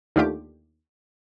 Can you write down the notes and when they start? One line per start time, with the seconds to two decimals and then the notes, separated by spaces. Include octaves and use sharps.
0.16 D#2 D3 A3 F4 G4 D6